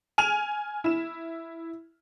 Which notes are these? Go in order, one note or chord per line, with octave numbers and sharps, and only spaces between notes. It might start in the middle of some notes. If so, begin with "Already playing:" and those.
G#5 F6 D#7 F7
E4 E7